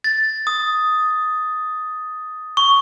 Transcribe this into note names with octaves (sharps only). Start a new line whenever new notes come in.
A6
D#6
C#6